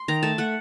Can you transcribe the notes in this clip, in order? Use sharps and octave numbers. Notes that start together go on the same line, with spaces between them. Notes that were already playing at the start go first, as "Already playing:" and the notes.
Already playing: C6
D#3 A#5
A3 A5
A3 F#5